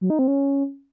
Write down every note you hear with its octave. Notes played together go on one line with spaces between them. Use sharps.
F#3
D#4
C4
C#4